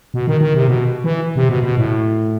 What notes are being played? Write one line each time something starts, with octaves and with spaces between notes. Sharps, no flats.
B2
D#3
D#3
C3
B2
E3
C3
B2
B2
A2